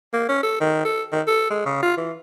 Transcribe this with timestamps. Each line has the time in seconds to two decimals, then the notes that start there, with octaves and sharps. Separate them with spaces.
0.13 A#3
0.29 C#4
0.43 A4
0.61 D#3
0.85 A4
1.12 D#3
1.27 A4
1.50 G#3
1.65 C#3
1.83 F4
1.97 E3